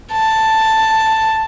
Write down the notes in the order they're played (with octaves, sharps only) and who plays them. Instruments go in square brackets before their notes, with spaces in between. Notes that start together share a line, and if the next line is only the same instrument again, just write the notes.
[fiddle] A5